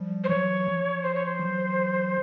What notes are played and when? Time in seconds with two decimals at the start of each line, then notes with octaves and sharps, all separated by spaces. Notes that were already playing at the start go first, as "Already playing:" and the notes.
Already playing: F3 G3
0.24 C5
0.29 E3 F#3 C#5
0.67 F3
1.03 C5
1.15 C#5
1.26 C5
1.39 E3 F#3